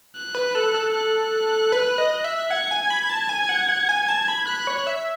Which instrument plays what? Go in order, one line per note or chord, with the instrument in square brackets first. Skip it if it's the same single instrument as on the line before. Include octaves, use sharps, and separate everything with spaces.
[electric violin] F#6
[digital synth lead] B4
A4
A4
[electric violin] F#6
[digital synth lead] B4
D#5
E5
[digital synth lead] F#5 [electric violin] G#6
[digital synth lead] G#5
B5
A5
[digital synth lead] G#5 [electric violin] G#6
[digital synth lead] F#5
F#5
G#5
[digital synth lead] A5 [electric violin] G#6
[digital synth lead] B5
[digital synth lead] B5 [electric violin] F#6
[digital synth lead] C#5
E5